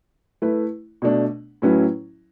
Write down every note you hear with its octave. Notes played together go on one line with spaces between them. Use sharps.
A3 E4 B4
B2 A3 D4
A2 F#3 C#4 E4 B4